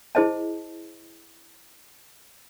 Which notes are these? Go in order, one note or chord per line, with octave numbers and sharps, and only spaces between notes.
E4 G#4 C5 D#5 A5